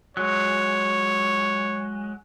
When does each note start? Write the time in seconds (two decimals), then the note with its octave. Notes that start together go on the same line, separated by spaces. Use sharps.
0.17 F#3 G#3 C#5